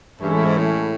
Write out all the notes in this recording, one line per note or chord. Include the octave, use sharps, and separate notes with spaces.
G2 E3 G#3 C#4 E4 A4
A2
G#2
A2